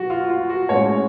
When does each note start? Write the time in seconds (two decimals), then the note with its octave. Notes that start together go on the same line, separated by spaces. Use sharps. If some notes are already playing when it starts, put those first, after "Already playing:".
Already playing: B2 F#3 F#4
0.10 F4
0.30 F4
0.49 F#4
0.69 A2 G#3 C#4 C#5